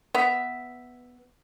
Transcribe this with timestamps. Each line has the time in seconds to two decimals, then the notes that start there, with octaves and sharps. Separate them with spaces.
0.15 B3 E5